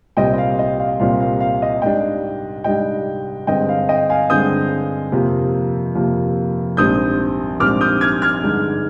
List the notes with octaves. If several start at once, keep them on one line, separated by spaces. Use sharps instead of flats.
C2 A#2 G3 C4 D#5 G5
D#5
F5
D#5
F5
C2 A#2 G3 C4 F5
F5
F5
D#5
G#2 G3 D4 D#5 G5
G#2 G3 D4 D#5 G5
G2 D3 G#3 C4 D#5 G5
F5
D#5 G5
F5 G#5
G2 D3 G#3 C4 D#6 G6
F2 C3 F3 A#3
F2 C3 F3 A#3
A#1 G#2 G3 C4 D#6 G6
A#1 G#2 G3 C4 D6 F6
D#6 G6
F6 G#6
F6 G#6
G2 D3 G#3 D#4